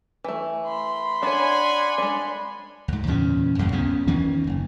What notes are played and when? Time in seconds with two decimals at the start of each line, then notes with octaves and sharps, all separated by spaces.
0.24 E3 A3
0.67 B5 C6
1.23 D4 C#5 D5 F#5 G#5
1.98 G#3 D4
2.88 D2 G#2
3.07 E2 A#2 C#3 C#4
3.59 A1 F#2 C#3
3.72 C#2 C#3 B3 C#4
4.07 E2 D#3 A#3 C#4
4.47 F#1